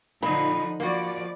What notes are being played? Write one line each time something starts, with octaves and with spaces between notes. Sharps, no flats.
A#2 D3 F3 D#4 D#5 B5
F3 A#3 F#4 D5